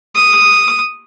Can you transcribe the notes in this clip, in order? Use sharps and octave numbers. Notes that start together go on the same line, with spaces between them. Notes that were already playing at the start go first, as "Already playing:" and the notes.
D#6